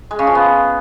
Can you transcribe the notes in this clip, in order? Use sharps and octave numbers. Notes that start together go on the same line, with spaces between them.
G#3
C#3
F3
B3